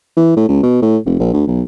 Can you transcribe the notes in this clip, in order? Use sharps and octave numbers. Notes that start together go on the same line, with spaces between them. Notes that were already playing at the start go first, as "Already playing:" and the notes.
E3
A2
C#2
B2
A2
F1
A#1
D2
B1